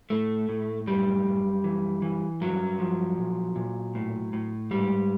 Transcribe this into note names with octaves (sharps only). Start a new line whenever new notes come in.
A2 A3
A2
F#2 G3
F#2
E3
E3
G2 F#3
F3
A#2
A#2
A2
A2
G#2 G3